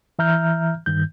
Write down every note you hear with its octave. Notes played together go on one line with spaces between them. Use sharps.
E3 E5 A#5 F6 G6
G2 D#3 G6